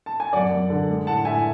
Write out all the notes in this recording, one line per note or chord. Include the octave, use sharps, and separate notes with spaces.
A5
G#5
F#2 D5 F#5
F#2
D3
G#3
A2 F#5 A5
A2 E5 G#5